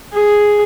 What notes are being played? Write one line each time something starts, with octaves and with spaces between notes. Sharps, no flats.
G#4